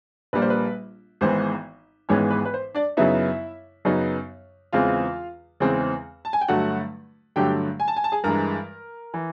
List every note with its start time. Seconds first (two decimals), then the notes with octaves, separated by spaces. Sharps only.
0.33 A#1 A#2 G3 A#3 B4
0.42 C5
0.50 B4
1.21 G#1 G#2 E3 G#3 B3 C5
2.09 G#1 G#2 E3 G#3 B3 C#4 C#5
2.31 B4
2.45 B4
2.54 C5
2.75 D4 D5
2.97 F#2 C#3 F#3 B3 D#4 E4 E5
3.85 F#2 C#3 F#3 B3 D#4
4.73 E2 C#3 E3 G#3 C4 F4 F5
5.60 E2 C#3 E3 G#3 C4
6.25 A5
6.33 G#5
6.41 G5
6.48 G2 D3 F#3 A3 F#4 F#5
7.36 G2 D3 F#3 A3 G4 G5
7.80 G#5
7.88 A5
7.96 G#5
8.04 A5
8.12 G#4 G#5
8.24 G2 E3 G#3 A#4 A#5
9.14 E3